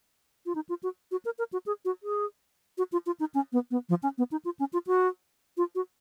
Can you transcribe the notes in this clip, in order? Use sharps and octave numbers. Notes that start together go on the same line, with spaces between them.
F4
D#4
F4
F#4
F#4
A#4
A#4
F#4
G#4
F#4
G#4
F#4
F4
F4
D#4
C#4
B3
B3
F3
C#4
B3
D#4
F4
C#4
F4
F#4
F4
F#4